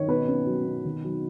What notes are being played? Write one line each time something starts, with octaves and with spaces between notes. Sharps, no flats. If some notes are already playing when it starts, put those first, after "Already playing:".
Already playing: D#3 C#5
B2 B4
C#4
F#3
B2
D#3
F#3